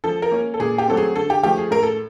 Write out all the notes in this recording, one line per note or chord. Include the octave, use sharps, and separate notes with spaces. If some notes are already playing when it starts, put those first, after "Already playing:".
F3 A4
A#4
A#3 C#4
A4
A#2 G#4
G4
F#3 A3 C4 A4
G#4
D3 A4
G4
F3 A3 G4
G#4
A2 A#4
A4